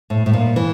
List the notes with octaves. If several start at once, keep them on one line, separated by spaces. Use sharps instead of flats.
A2
A2
A#2
E3